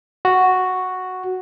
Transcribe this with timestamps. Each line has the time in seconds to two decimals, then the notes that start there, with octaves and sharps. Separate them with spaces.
0.25 F#4